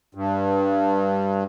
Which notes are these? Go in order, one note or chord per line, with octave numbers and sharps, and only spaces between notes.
G2